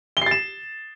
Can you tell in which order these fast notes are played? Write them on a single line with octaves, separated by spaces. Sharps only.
G7 C7 A6 E7